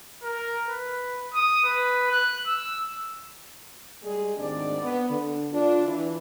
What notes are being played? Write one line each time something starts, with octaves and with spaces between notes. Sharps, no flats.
A#4
B4
D#6
B4
F#6
E6
G3 G#3 G#4
D2 G#2 D#3 C4 D4 D5
B3
D3
D4 F4
E3